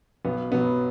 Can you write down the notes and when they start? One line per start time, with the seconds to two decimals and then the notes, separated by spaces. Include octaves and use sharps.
0.25 B1 B3
0.51 B2 B3
0.55 F#3